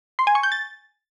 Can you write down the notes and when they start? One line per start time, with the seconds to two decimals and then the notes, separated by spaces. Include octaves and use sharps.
0.19 C6
0.27 G#5
0.35 C#6
0.43 G6
0.52 A6